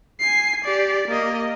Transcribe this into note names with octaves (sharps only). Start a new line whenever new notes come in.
G#5 C7
G4 D5
A#3 D#5